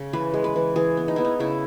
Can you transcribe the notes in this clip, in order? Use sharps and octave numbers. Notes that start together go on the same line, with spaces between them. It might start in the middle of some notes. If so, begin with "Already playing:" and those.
Already playing: C#3
E3 B4
G#3
B4
E3
E3 G#4
B3
D#4
B3 E4
D#4
C#3 E4